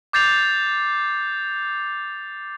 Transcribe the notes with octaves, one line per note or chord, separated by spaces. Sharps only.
D6 G6 A6 C7 F7